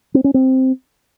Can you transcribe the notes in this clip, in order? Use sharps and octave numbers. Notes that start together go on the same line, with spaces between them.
C4
C#4
C4